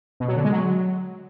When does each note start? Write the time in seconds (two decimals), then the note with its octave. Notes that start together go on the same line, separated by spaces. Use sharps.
0.20 B2
0.28 F#3
0.36 D3
0.44 G#3
0.53 F#3